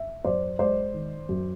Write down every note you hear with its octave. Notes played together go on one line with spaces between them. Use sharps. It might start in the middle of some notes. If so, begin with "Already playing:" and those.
Already playing: E5
F#2 C5 D5
G#3 C5 D5
D#3
F#2